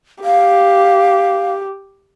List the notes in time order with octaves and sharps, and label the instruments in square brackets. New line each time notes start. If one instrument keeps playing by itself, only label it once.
[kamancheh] G4 [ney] F5